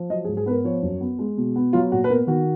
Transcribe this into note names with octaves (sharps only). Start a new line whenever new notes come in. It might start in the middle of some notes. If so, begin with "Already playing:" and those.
Already playing: F3
F#3 D#5
G#4
G#2
G#4
B3 A#4 B4
F3 C#5
F#2
B3
G#3
B2
B3
F#3 F4
A#2 F#4
B4
B3 A#4
D#3 F#4